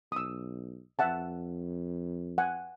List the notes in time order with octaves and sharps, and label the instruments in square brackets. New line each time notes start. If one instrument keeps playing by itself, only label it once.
[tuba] B1 [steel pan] D#6 E6
[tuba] F2 [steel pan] E5 F#5 A5
[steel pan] F#5 G#5